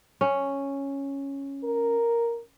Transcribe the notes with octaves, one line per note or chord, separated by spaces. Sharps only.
C#4
A#4